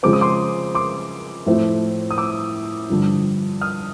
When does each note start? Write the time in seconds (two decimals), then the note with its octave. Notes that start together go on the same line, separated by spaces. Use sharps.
0.03 C#3 F3 G#3 C4 D6
0.13 D#6
0.21 C6 D6
0.75 C6 D6
1.46 A2 F3 A3 C4
2.11 D#6
2.18 D6 E6
2.90 G2 D3 F3
3.61 D#6 F6